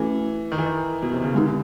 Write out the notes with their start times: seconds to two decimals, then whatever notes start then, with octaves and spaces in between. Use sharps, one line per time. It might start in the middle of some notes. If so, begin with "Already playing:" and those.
Already playing: E3 A3 C#4 F#4 A4
0.52 D#3
0.58 E3
0.66 D#3
1.03 B2
1.13 C3
1.24 C#3
1.34 D3 G#3 C4 D#4 G4